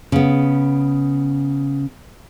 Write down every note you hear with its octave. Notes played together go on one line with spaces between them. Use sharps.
C#3 B3